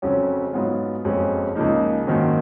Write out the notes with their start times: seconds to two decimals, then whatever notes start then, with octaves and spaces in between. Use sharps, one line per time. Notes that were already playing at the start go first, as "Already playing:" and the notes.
0.02 F1 F2 C#3 F#3 C#4
0.53 G#2 F#3 B3 F4
1.05 F#1 F2 F3 G#3 C#4
1.55 C#2 C#3 F3 A#3 D#4
2.07 G#1 F#2 D#3 A#3